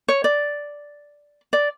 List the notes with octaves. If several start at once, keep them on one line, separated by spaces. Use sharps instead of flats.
C#5
D5
D5